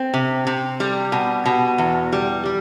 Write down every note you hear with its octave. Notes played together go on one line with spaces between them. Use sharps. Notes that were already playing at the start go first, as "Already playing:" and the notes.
Already playing: C4
C3
C3
G3
B2
B2
E2
G3
G3